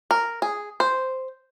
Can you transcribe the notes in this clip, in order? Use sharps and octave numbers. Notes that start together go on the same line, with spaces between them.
A#4
G#4
C5